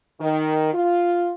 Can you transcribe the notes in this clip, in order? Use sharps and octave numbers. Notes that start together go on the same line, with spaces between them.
D#3
F4